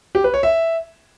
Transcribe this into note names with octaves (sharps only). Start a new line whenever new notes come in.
G4
B4
C#5
E5